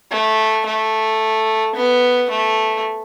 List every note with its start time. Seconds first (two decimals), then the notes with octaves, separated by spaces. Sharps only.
0.11 A3
0.66 A3
1.75 B3
2.30 A3